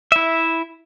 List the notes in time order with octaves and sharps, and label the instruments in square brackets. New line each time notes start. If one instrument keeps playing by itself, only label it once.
[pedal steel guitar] E4 E5